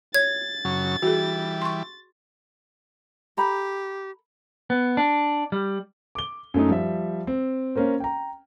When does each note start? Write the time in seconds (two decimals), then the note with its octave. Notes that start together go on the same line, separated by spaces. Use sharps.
0.14 C#5 G#6 A6
0.65 F#2 C#3 F#3
1.02 E3 G3 F#4 G#4
1.62 C6 C#6
3.37 G4 A4 A#5 B5
4.70 B3
4.97 D4
5.52 G3
6.15 D6 G7
6.54 F#2 A3 D#4
6.69 F3 G3 E5
7.27 C4
7.76 A#3 C#4 A#4 C5
8.00 G5 A#5